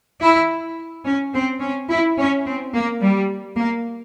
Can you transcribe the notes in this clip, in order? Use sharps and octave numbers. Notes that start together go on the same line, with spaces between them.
E4
C#4
C4
C#4
E4
C#4
C4
A#3
G3
A#3